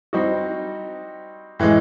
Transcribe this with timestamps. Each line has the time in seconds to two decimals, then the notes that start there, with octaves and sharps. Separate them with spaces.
0.13 G3 C4 D#4 F#4
1.60 A2 E3 G#3